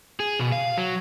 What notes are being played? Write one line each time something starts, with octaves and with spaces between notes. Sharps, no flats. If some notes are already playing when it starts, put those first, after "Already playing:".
G#4
B2
F5
F#3